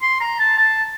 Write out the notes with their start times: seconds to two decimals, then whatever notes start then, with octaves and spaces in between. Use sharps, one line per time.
0.02 C6
0.21 A#5
0.39 A5
0.58 A5